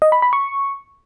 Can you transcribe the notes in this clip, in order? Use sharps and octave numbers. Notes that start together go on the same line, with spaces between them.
D#5
B5
B5
C#6